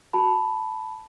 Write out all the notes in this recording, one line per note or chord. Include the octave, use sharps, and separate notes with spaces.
F#4 A5 B5